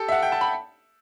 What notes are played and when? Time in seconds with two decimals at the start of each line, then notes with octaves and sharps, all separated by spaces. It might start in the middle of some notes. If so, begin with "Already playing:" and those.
Already playing: G4 A4
0.08 E5
0.12 F#5
0.23 G5
0.32 A5
0.41 B5